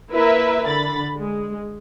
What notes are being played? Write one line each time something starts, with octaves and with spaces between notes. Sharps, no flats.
A#3 E4 A#4 B4 E5
D3 B5 A6
G#3